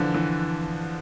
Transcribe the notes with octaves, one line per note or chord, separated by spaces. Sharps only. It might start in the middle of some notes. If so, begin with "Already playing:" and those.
Already playing: D3 E3 F3
E3